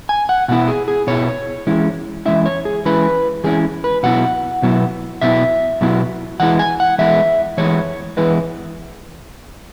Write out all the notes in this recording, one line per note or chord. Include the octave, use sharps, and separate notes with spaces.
G#5
F#5
B2 B3 E4 F#5
G#4
G#4
B2 B3 E4 C#5
E3 G#3 C#4 E4
E3 G#3 C#4 E4 E5
C#5
G#4
E3 G#3 C#4 E4 B4
E3 G#3 C#4 E4 G#4
B4
B2 F#3 B3 E4 F#5
B2 F#3 B3 E4
B2 F#3 B3 E4 E5
B2 F#3 B3 E4
E3 G#3 B3 E4 F#5
G#5
F#5
E3 G#3 B3 E4 E5
E3 G#3 B3 E4 C#5
E3 G#3 B3 E4 B4